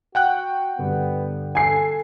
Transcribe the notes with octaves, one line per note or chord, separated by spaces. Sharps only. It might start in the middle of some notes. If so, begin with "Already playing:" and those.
F#4 F#5 G5 F#6
G2 D3 B3
A4 G#5 C7